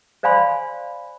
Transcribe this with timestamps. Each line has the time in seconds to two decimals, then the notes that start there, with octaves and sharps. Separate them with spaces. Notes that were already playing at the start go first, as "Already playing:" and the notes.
0.23 C5 D5 F5 G#5 B5 C6